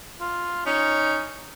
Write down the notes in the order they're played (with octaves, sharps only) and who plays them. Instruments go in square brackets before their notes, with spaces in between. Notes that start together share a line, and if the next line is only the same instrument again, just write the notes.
[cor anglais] F4
[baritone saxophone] C#4 [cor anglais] D#4